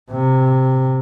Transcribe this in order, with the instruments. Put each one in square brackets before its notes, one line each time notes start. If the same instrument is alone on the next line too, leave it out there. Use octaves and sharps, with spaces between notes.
[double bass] C3